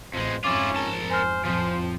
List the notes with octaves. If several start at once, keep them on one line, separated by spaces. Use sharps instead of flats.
A1 F2 G#3 C5
F2 G#2 C#4 E4 F4 D6 A6
A#4 A5 G7
C5 G#5 F6
F2 A2 F3 C5